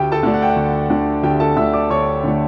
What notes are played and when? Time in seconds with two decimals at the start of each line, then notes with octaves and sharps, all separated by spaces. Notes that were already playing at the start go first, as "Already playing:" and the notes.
Already playing: D2 G4 G5
0.12 A4 A5
0.23 D3 A3 D4
0.34 F#5
0.42 G5
0.50 F#5
0.56 D2
0.90 D3 A3 D4
1.23 D2 G4 G5
1.40 A4 A5
1.56 D3 A3 D4 E5 E6
1.73 D5 D6
1.90 D2 C#5 C#6
2.24 D3 A3 D4